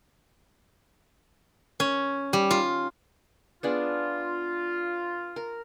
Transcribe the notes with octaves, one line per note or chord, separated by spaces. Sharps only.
C#4
G3
F4
B3 D4 F4 G#4
A#4